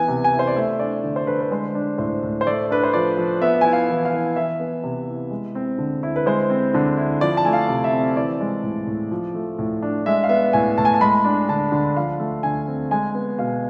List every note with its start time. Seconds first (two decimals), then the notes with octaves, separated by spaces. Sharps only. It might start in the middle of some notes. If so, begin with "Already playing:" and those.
Already playing: E3 B3 G#5
0.08 C3
0.24 G#5
0.33 E4
0.39 C5
0.47 D5
0.56 A3 E5
0.79 D4 D5
1.03 D3
1.16 C5
1.27 D3 B4
1.41 B4
1.51 G#3 C5
1.75 D4
1.98 A2 C5
2.23 A2
2.41 C5
2.47 A3 D5
2.71 D4 B4
2.83 C5
2.94 F3 D5
3.17 F3
3.42 B3 E5
3.61 E4 G#5
3.73 F5
3.89 E3
4.05 F5
4.13 E3
4.36 E3 E5
4.60 B3
4.84 C3
5.08 E4
5.31 G#3
5.55 C4
5.78 D3
6.03 E4
6.16 B4
6.26 G#3 C5
6.50 C4
6.74 D3
6.97 E4
7.21 F3 D5
7.37 A5
7.45 A3 G#5
7.53 F5
7.68 C3
7.84 E5
7.92 C4
8.17 E3 D5
8.40 G#3
8.63 A2
8.87 A2
9.11 F3
9.34 A3
9.59 A2
9.82 D4
10.06 G#3 E5
10.24 F5
10.29 B3 E5
10.53 A2 G#5
10.78 A2 A5
10.85 G#5
10.94 A5
11.01 G#3 B5
11.24 D4
11.49 D3 A5
11.72 D3
11.97 F3 F5
12.20 A3
12.43 D3 G#5
12.68 C4
12.91 G#3 G#5
13.14 B3
13.38 B2 F5